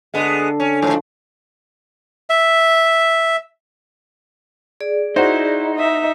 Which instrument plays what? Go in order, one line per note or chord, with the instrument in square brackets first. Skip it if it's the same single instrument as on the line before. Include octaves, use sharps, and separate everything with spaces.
[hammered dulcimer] D3 A5 [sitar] G#3 B3
[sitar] C#4
[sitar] D#2 G#2 [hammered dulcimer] F3
[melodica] E5
[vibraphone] G#4 D5
[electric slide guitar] D#4 [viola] E4 [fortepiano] F#4 C5
[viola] D#5 E5